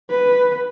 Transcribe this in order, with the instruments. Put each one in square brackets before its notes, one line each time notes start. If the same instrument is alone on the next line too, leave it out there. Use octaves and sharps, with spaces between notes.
[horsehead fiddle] B4